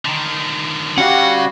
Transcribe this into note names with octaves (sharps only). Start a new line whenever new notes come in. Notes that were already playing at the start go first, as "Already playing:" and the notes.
D3 D#3
G3 C#4 F#4 F5 F#5